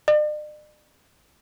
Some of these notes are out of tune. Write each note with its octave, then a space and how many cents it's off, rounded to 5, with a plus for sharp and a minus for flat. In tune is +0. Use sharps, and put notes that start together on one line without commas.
D5 +45